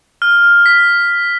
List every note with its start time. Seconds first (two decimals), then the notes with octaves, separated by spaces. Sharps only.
0.22 F6
0.66 B6